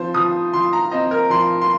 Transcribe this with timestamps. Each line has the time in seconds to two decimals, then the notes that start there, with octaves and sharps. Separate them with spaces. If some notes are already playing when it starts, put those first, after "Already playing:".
Already playing: F3 C4 C5
0.14 F3 D#6
0.53 F3 C6
0.73 A#5
0.92 C4 D#5
1.11 A#4
1.30 F3 C6
1.61 C6